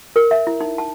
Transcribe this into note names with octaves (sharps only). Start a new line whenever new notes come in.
A#4
E5
E4
D#4
A5